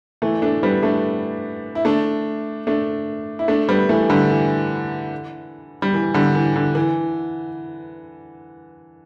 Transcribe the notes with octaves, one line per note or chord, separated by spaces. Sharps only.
E3 A3
A3 D4
G3 B3
A3 D4
E4
A3 D4
A3 D4
E4
A3 D4
G3 B3
E3 A3
D3 G3
E3
G3
E3
D3 G3
E3
D3
E3